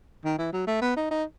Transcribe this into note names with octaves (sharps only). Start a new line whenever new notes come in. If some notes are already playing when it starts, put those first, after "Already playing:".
D#3
E3
F#3
A3
B3
D#4
D#4